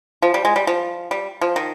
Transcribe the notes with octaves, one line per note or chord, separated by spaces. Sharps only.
F3
G3
G#3
G3
F3
G3
F3
D#3